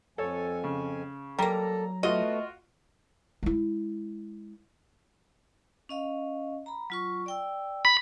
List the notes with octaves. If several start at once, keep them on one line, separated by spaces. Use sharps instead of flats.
F2 F3 A4 C#5 G#5
C#3
F#3 G3 A#3 A4 A#5
A3 B3 F4 F#4 D#5
G#3 E4
C#4 D#5 F5
A#5 B5
F#3 F4 C#6
D5 G5 E6
B5